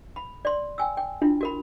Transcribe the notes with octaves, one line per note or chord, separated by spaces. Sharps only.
B5
D5 C6
G5 G#5 E6
G5
D4 E4 F4
F#4 A#4 B5